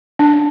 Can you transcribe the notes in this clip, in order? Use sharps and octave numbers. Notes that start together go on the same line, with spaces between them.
D4